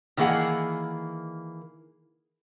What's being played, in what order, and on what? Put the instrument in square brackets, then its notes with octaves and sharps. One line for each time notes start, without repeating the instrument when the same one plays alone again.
[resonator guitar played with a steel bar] D#3 E3 A#3 G#4 F#5